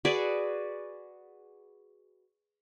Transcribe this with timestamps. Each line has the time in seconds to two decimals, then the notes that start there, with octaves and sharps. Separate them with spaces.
0.05 F#4 G#4 B4 D5